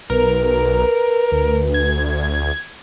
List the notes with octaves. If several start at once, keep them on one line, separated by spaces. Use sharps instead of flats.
B1 A#4 B4
D2
G#6